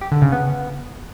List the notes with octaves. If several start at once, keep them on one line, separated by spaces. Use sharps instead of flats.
G4
D3
C#3
B3